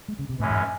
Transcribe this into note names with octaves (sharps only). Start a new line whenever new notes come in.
G#3
C#3
C3
F#2 A2 E3 G#3 C#4
G#2